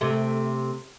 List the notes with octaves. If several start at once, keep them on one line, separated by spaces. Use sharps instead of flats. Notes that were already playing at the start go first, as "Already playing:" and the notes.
C3 A3